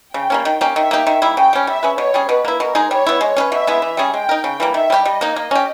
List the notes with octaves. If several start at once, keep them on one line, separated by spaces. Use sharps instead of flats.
C#3 G5
G3 A#3 C#4
D#3
A#3 C#4 G4
D#3 E5
A#3 D#4 G4
D#3
G3 A#3 E4
C#3 G5
G3 C#4
G3 E5
C#4 G#4 B4
B2 C#5
G3 C#4 G#4
B2 B4
A#3 E4
B2 A#4
G#3 D#4 G#4
G3 C#5
B3 E4
G#3
C#4 G#4 B4
B2 E5
G#3 B3 E4
E3
G3 C#4 G#4
G#3 G5
D#4 A#4
C#3
E3 G3 A#3
D#3 E5
G3 C#4 G4
G3 D#5
A#3 D#4
A#3
C#4 G4